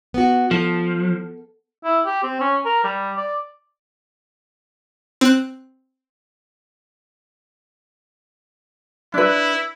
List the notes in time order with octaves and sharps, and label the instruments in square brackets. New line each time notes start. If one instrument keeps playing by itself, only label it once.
[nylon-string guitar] B3 F#4
[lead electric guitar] F3 [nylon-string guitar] A4
[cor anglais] E4
G4
C4
C#4
A#4
G3
D5
[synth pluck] C4 F#6
[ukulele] D4 B4 [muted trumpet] E4